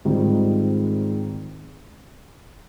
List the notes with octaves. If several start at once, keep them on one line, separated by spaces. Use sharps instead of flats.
G#2 D#3 G3 C4 F4